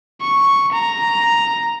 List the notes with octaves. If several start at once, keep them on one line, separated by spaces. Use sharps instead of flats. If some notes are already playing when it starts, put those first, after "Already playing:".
C#6
A#5